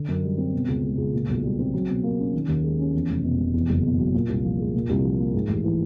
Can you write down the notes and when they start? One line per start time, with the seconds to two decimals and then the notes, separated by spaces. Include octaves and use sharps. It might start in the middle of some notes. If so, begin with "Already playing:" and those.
Already playing: D3
0.08 F#2
0.23 G3
0.38 C4
0.54 B2
0.68 C#2
0.84 G#3
0.98 C#2
1.13 A#2
1.29 B1
1.44 G3
1.59 C4
1.74 F#3
1.89 B2
2.03 A#3
2.19 C#4
2.33 D#3
2.48 D#2
2.63 G#3
2.79 C#4
2.93 E2
3.09 F1
3.24 B2
3.40 F1
3.54 E2
3.70 F#1
3.85 B2
3.99 F#3
4.14 A#2
4.29 C2
4.44 F3
4.59 G#3
4.75 A#2
4.89 C2
5.04 F3
5.19 A#3
5.34 G#2
5.49 A1
5.64 E3